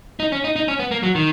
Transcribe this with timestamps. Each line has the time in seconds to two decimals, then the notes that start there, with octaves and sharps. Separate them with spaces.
0.20 D#4
0.32 C#4
0.44 D#4
0.56 D#4
0.68 C#4
0.79 B3
0.91 A#3
1.03 F#3
1.15 D#3